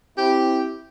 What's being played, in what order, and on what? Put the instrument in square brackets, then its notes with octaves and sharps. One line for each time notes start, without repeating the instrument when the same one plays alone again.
[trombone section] C4 E4 [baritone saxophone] G4